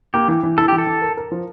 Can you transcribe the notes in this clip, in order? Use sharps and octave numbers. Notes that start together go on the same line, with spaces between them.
A#3 G4
E3
E3
E4 A4
E3 G4
A4
E3
A#4
A#4
F3